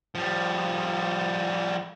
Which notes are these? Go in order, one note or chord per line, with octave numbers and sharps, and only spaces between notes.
F3 G3